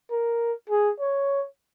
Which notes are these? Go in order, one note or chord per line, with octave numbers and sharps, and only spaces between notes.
A#4
G#4
C#5